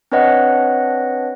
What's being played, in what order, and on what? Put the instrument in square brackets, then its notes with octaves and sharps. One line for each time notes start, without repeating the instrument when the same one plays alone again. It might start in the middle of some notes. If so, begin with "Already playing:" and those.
[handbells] C4 D4 B4 C#5 D#5 F#5